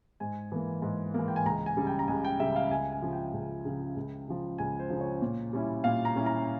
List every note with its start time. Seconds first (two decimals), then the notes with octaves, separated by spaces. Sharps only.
0.20 G#2 G#5
0.52 E3 A#3
0.82 G#2
1.14 E3 A#3
1.28 G5
1.36 G#5
1.46 C#2 A#5
1.66 G#5
1.77 C#3 G3
1.87 G5
1.99 A#5
2.08 C#2 G#5
2.25 G5
2.40 C#3 G3 E5
2.56 F5
2.71 C#2 G#5
2.92 G#5
3.02 C#3 F3
3.13 G5
3.33 C#2
3.65 C#3 F3
3.96 C#2
4.28 C#3 F3
4.58 C#2 G#5
4.80 C5
4.90 C#3 F3
5.01 C#5
5.22 A#2
5.53 G3 C#4 E4
5.84 A#2 F5
6.05 A#5
6.15 G3 C#4 E4
6.26 A#5